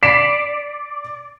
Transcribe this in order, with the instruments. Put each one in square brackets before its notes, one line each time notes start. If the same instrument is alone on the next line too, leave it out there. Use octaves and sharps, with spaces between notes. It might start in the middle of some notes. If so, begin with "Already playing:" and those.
[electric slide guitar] D5 [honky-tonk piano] B6 C7 E7